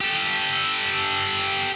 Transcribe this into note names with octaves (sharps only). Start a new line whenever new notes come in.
G4 A4